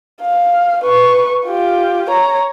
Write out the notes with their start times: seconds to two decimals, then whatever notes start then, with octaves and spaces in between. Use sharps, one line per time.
0.21 F5
0.84 B4 C#6
1.46 F4 G4
2.09 C#5 A#5